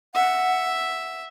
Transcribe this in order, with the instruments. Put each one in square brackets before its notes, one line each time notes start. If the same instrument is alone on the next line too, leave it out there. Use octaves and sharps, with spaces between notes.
[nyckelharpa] E5 [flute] F#5